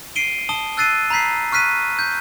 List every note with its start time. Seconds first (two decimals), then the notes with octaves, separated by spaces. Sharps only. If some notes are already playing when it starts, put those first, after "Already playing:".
0.16 C7 D7 D#7 G7
0.49 A5 D#6 G7
0.77 E6 F#6 A6 C7 D#7
1.10 A#5 B5 G6 B6 C7
1.52 C#6 F6 F#6 B6 D#7
1.99 G6